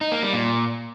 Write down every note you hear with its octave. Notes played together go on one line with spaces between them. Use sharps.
D#4
A#3
G3
A#2